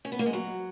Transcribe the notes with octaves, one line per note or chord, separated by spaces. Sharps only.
C#4
B3
A#3
G#3
F#3